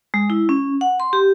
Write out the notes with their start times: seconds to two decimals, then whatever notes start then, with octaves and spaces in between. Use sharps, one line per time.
0.14 G#3
0.30 E4
0.49 C#4
0.81 F#5
1.00 C6
1.13 G4